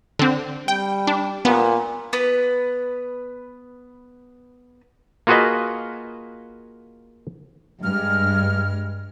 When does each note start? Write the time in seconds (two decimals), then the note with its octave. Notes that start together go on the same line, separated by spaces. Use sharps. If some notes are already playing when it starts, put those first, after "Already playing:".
0.19 D3 C4
0.68 G3 G5
1.07 D4
1.45 A#2 B3
2.13 B3 B4
5.27 A#3 F4 F#4 G#4 B4 D#5
7.82 G2 G#3 F6